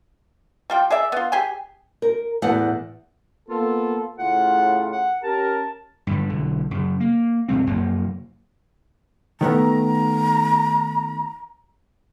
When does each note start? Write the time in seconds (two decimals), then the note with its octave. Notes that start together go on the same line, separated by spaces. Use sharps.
0.70 G3 F4 G5
0.91 G#4 D5 E5
1.12 B3 F4
1.32 G4 G#4 G#5
2.02 A#4
2.42 E2 A2 F#5
3.49 A#3 B3 F4 A4
4.19 A2 C#3 F4 F#5
4.92 F#5
5.24 C#4 G4 A#4 A5
6.07 G2 D3 G3
6.29 B1 D3
6.71 F#2 C#3
7.00 A#3
7.48 F2 C3 G3 C4
7.67 F1 F#2 A#3
9.41 D#3 A3 B3 A#5